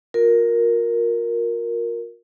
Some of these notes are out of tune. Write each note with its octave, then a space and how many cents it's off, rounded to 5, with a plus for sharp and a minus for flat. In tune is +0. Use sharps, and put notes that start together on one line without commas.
F4 +40 A#4 +0